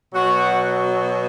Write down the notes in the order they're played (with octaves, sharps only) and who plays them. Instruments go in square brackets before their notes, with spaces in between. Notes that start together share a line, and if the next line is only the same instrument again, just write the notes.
[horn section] B2 F#3 F#4